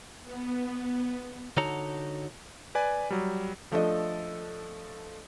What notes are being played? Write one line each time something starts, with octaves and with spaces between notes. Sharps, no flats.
B3
D3 D#4 F#4 A4 C#5 A#5
B4 D5 G#5
F#3 G3
F3 A3 D4 A4 D#5